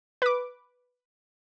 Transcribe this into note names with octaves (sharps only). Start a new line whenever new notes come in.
B4 D6